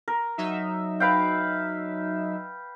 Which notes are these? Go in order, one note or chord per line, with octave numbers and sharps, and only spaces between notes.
A#4
F#3 D#4 E5
B4 F5 G5